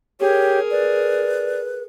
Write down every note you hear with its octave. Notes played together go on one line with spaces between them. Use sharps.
G4 G#4 A#4 C#5
B4 D5